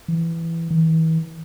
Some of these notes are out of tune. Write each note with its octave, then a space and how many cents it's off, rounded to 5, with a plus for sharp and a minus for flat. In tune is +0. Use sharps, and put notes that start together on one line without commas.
E3 +10
E3 -40